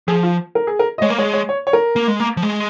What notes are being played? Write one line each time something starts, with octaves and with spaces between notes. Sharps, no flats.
F3 G#4
F4
A#4
G#4
A#4
D#5
G#3 C#5
A#3
G#3 C#5
C#5
C#5
C#5
A#4
A#3
G#3
A#3
F3
G#3